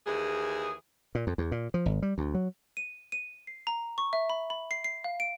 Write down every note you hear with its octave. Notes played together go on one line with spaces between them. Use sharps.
D#2 E3 G#4
A#2
F2
E2
A#2
F3
G#1
G3
D2
F#3
D#7
D#7
C7
A#5
C#6
E5
B5
B5
C7
C7
F5
D7